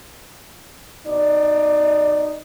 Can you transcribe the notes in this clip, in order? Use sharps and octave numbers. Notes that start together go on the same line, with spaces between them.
B2 D#4 D5